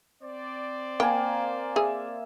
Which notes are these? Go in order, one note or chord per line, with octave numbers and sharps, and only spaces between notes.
C4 C5 D5
A#3 G5 G#5
G#4 E5